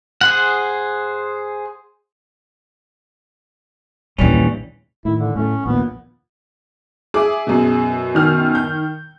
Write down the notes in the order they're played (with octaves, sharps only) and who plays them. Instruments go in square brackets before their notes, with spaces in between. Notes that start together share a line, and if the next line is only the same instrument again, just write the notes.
[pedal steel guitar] G#4 C5 F#5
[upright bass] A#1 D#2 [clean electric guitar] E3 G3 C#4
[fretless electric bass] A2 D#3 [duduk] E4
[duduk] D3
[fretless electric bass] A2 A3 [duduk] C#4
[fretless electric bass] A#1 D#2 A#2 [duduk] B3
[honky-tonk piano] G#4 [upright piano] E5 D6
[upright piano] F#2 B2
[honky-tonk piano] D#3 F6
[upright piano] G6